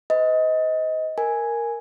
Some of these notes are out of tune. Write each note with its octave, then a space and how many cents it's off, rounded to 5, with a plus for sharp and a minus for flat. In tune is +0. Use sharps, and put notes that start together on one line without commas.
C5 -45 D#5 +20
A#4 +0 G#5 +0